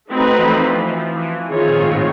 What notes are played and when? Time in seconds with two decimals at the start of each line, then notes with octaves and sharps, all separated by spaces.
0.09 A3 C4 D#4 F#4 B4
0.38 E3
0.45 F3
0.80 F3
1.15 E3
1.50 D#3 C4 F4 G#4 C#5
1.68 A#2
1.81 G#2
1.86 A2